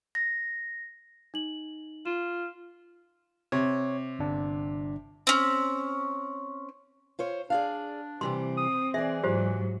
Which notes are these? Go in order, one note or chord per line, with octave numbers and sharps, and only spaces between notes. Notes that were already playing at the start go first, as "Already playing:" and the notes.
A#6
D#4 F#7
F4 E7
C3 C#5
G1 D4
C4 C#4
F4 C5 C#5
D4 G#4 D5 F5
C3 E3 G3 C4 C6
D#6
E3 G#4 D5 E5
G#2 F#3 F4 G4 C5